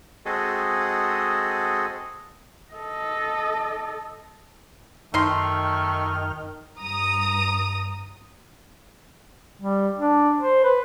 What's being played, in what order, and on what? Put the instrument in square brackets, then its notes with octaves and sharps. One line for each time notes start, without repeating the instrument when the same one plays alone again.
[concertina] G#3 C4 F#4 G#4 A4 D#5
[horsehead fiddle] A4 D#5
[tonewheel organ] F#2 G5 F6 [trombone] D#3 [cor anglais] A3 [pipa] D#4 C6
[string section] G2 A#5 D#6
[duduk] G3
D4
C5
B4